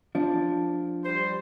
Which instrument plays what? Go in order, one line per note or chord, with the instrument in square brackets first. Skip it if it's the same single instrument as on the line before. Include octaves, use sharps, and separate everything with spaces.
[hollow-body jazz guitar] F3 D4
[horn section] G3 C5